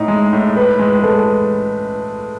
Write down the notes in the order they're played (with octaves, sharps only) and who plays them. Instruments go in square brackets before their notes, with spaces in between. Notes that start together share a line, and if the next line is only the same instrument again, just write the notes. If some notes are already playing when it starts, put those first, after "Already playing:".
Already playing: [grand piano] A2 D#4
G#3
A2
[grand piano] A2 [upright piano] B4
[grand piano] G#3
[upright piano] B4
[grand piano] G#3 [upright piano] A4